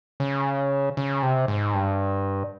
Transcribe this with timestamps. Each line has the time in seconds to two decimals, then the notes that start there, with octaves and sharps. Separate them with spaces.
0.20 C#3
0.97 C#3
1.23 C3
1.48 G#2
1.74 G2